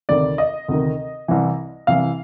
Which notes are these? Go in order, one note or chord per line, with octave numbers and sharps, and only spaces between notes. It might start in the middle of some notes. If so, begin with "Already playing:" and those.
D2 C3 D#3 D5
D#5
D2 C3 D#3
C2 C3 E3
C2 C3 E3 F5